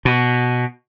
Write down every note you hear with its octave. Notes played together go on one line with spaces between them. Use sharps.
B2